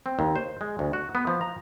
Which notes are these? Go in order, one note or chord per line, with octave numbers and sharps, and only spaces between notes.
C4
D#2
C5
G#3
D2
F#4
B3
F3
A#5